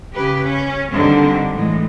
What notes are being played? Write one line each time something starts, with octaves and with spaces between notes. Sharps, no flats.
C#3 G4 B4
C#4
D3 D#3 G3 C4
A2 E3 G#3